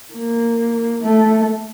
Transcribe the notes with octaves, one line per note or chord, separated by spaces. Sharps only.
A#3
A3